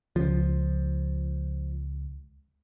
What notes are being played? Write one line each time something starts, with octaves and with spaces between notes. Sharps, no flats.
C#2 F3